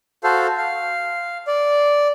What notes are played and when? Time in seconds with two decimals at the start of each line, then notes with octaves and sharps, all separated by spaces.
0.24 F#4 A4 C5 F5
0.57 F5
1.47 D5